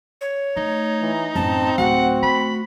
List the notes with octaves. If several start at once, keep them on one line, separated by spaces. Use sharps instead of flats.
C#5
A3 D#4
E3
A1 F#2 C4 A5
D1 F#4 F#5
A3 B5